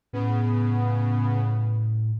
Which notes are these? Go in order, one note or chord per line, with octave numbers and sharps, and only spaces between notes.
A2 C#3 B3